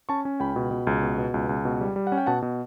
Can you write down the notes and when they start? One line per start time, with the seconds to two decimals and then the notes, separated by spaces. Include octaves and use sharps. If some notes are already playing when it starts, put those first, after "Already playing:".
0.09 C#4 A5 C#6
0.25 C#4
0.40 C#2 G5 B5
0.56 B2
0.71 B2
0.87 C#2
1.03 B2
1.18 B2
1.34 C#2
1.49 C#2
1.65 B2
1.81 G3
1.96 G3
2.07 F#5
2.12 C#4
2.18 G5
2.26 B2 F#5 A5
2.42 B2